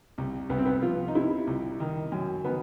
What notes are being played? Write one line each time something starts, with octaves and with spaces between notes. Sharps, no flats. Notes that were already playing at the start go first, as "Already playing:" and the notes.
C2
C2 B3
C4
B3
F3 F4
D#4
C3 E4
C2
D#3
F#2
D#3 B3